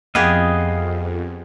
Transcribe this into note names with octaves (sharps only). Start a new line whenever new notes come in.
F2 B3 G4 G#4 D#5 F5